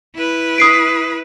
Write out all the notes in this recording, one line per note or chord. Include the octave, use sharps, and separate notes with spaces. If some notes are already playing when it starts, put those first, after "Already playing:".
E4 B4
D#6 C7 D7